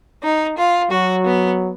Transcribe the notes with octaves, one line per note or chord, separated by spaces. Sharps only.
D#4
F4
F#3 F#4
B3